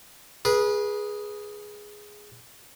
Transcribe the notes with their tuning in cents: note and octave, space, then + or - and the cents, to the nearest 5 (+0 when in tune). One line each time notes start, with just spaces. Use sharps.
G#4 +0 B4 -25